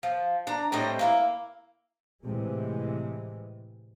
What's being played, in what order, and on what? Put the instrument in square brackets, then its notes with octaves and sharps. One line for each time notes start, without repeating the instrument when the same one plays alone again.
[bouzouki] F3
D4 A#5
A2 G3 C4 D#5
A#3 D4 E4
[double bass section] A2 C3 E3 G#3